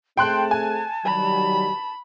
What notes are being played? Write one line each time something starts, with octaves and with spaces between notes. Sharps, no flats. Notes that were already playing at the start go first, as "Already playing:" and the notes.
A3 C4 G#4 G5 A5 C6 F#6
G#5
D#3 F#3 G3 B5